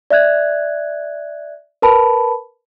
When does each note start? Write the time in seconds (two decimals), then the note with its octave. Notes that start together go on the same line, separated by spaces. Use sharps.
0.11 D5 E5 F#6 G#6
1.82 A#4 B4 A5 B5